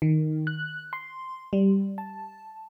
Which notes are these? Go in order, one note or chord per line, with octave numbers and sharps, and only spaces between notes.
D#3
F#6
C6
G3
A5